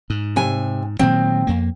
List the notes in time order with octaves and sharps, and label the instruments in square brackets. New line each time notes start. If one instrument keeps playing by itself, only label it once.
[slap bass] G#2
[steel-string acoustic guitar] C3 G#5
[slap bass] A#2 D#3 F#3 [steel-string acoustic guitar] C4
[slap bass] F2 A#3